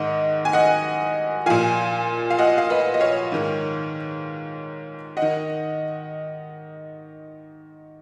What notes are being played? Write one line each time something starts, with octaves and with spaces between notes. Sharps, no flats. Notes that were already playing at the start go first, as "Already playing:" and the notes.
Already playing: G#2 D#3 D#5 F#5
G#5
D#5 F#5
A#2 F3 F5 G#5
F5
D#5 F#5
F5
B4 D#5
D#5
C#5 F5
G#2 D#3
D#3 D#5 F#5